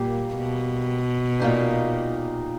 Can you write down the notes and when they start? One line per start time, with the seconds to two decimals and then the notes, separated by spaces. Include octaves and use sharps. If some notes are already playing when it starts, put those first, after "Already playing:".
Already playing: A#2 G3 A#3 G4
0.37 B2
1.40 A#2 A#3 D#4 G4